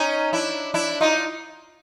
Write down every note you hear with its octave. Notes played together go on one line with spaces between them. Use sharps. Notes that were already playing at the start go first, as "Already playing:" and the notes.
Already playing: C#4 D#4
D4 E4
D4 E4
D#4 F4